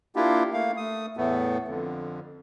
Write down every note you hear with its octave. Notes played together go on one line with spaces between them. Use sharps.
A#3 D4 E4 F4 G4
A3 A#3 F5
A3 D#6
E2 A2 A3 B3
F2 D3